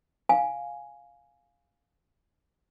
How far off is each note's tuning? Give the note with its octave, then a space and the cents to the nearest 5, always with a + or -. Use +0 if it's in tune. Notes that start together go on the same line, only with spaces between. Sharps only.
F5 +5 G#5 +0